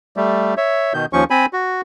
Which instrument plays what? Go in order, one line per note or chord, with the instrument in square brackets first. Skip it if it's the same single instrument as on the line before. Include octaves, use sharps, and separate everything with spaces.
[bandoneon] G3 A3
C#5 E5
B2 D#3 G6
D#2 F3 C#4 C#6
C4 G#5 B5
F#4